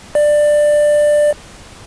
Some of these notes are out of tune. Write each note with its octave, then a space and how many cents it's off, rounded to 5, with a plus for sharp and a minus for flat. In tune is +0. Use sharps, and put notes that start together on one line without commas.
D5 +15